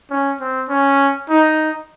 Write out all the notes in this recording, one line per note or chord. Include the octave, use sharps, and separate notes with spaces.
C#4
C4
C#4
D#4